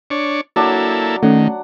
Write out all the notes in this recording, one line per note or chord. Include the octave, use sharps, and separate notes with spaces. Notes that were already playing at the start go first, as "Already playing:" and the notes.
D4 C#5
F#3 A#3 D4 E4 A4 D5
D#3 A3 C#4 F#5